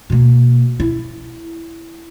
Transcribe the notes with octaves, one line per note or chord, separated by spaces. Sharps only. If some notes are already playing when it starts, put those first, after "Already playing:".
B2 A#3
E4